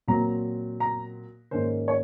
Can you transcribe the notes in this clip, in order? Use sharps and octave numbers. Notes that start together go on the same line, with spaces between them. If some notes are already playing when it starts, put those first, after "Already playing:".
A#2 F#3 C4 A#5
A#5
G#2 D#3 A#3 C#4 C5
C#5